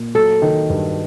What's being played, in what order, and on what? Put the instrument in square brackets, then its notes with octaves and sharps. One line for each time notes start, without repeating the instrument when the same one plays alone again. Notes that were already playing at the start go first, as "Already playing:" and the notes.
Already playing: [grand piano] A#2
[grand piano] F#3 [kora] A4
[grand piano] D#3
G2